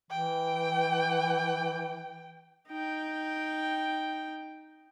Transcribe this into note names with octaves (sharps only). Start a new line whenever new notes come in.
E3 G5
D#4 G5